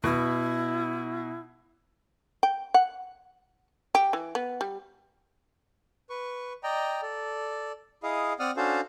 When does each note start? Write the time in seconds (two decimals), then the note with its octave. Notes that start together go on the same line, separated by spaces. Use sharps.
0.04 B2 E4
2.43 G5
2.74 F#5
3.95 G4
4.13 E3
4.35 B3
4.61 G3
6.10 B4 C#6
6.63 D5 D#5 G5 A#5
7.02 A4 D5
8.03 E4 G#4 D#5 F5
8.40 C4 D5 F#5 D#6 F6
8.57 C#4 D4 F#4 A4 C5 F5